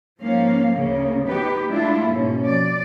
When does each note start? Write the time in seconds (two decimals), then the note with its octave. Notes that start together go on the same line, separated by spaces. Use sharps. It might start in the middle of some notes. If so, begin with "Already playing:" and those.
0.21 G#2 F3 A#3 C#4 F5
0.73 D2 C#3 A#3 C#4
1.27 B3 D#4 G4 B4
1.70 G#3 A3 D4 E4 F4
2.08 G#2 B2 A#3 C#4
2.45 F2 D5